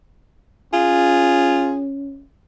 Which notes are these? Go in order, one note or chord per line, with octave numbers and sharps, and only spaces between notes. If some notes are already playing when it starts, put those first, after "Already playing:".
C#4 F4 G#4